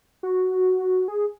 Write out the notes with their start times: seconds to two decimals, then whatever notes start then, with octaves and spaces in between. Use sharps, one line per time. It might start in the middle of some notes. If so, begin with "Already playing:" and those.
0.23 F#4
1.08 G#4